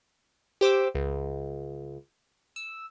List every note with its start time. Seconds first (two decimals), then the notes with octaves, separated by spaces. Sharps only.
0.61 G4 C5 D6 E6
0.95 C#2
2.56 E6